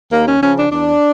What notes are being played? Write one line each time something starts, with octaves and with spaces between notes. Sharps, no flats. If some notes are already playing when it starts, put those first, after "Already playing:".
D#2 A#3
C#4
C#3 F3 C#4
D4
E2 D4